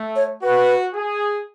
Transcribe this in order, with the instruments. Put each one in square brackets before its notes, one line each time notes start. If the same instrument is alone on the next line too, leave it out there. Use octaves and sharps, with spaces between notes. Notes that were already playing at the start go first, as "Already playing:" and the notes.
Already playing: [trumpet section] A3
[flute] C#5
[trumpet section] F#4 [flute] B4
[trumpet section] G#4